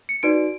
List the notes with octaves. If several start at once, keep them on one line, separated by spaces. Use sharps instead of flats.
C#7
D#4 F#4 B4 D5 D7